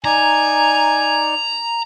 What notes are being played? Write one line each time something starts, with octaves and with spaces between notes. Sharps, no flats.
D#4 D5 G#5 A#5